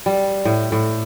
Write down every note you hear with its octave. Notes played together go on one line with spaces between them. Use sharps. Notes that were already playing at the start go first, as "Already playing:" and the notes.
G3
A2
A2